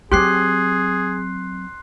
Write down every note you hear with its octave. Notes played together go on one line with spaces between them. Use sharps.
F#3 C4 G4 G#4 C6 F#6 C7